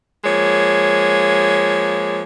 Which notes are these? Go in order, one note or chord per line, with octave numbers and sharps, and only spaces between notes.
F3 G#3 A#3 C#5